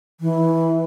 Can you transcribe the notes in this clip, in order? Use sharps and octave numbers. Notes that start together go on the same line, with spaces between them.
E3